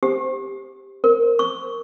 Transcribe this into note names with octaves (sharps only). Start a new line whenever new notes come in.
G4
A#4
C#6